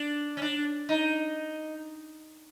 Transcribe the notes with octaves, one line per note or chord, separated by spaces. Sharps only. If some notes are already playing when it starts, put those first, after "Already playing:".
Already playing: D4
C#4
D4
D#4